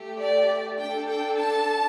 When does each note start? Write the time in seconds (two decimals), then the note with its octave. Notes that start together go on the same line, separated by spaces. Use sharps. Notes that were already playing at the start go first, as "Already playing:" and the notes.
Already playing: A3 G4
0.21 D5
0.79 D4 A4 G5
1.09 G5
1.38 A5